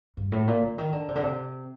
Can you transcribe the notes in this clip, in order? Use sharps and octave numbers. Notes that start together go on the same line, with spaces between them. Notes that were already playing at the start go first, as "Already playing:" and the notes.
G2
A2
A#2
D3
D#3
D3
C3
D3
C3